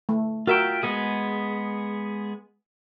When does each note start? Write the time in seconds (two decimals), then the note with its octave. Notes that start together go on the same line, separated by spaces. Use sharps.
0.09 A3
0.47 F4 F#4 A#4 E5 G5
0.83 G#3 B3 G#4